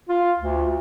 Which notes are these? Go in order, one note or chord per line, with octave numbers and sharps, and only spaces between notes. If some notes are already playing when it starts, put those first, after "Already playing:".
F4
D2